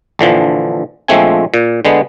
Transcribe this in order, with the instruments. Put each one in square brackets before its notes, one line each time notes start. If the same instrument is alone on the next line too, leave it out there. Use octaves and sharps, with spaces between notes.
[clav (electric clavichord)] A#1 D3 E3 F3
A#1 F3 G#3 A3 C4 G#5
A#2
D3 G#3 B3